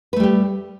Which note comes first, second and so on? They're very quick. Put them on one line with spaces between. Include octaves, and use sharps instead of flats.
B4 A3 G3 G4